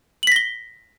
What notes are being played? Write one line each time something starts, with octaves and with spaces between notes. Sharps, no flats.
A#6 B6 F#7 G7